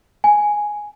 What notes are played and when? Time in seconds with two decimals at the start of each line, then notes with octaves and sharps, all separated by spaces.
0.24 G#5